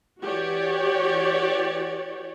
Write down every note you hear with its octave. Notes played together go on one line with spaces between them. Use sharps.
E3 F#4 G4 C#5 D5